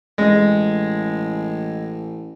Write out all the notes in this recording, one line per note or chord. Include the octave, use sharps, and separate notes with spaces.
A1 G#3